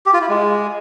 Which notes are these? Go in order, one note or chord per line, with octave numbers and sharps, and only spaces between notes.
G4
F4
E4
G#3